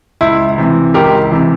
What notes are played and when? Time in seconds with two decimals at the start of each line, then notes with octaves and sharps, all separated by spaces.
0.21 C#2 E4
0.58 C3 E3
0.94 C#2 G4 A#4
1.32 C3 E3